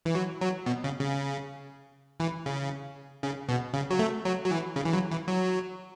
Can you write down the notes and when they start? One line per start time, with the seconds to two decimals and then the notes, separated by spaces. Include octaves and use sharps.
0.05 E3
0.15 F#3
0.41 F#3
0.66 B2
0.84 C#3
1.01 C#3
2.20 E3
2.46 C#3
3.23 C#3
3.49 B2
3.74 C#3
3.90 F#3
3.99 A3
4.25 F#3
4.46 F#3
4.51 E3
4.76 C#3
4.85 E3
4.93 F#3
5.11 E3
5.28 F#3